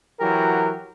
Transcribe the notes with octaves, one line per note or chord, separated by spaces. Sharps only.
E3 F#3 F#4 G4 A#4